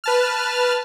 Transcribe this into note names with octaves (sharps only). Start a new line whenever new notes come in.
B4 A5 F6